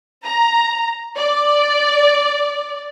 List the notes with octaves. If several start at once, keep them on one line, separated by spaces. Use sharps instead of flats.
A#5
D5